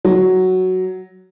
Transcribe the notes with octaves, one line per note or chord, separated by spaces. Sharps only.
F#3